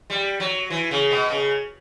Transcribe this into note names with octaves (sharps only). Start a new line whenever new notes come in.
G3
F#3
E3
C#3
B2
C#3